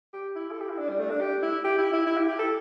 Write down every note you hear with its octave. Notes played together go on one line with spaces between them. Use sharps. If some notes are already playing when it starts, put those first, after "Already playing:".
G4
E4
A4
G4
E4
D4
G3
A3
D4
G4
E4
G4
E4
E4
E4
G4
G4
A4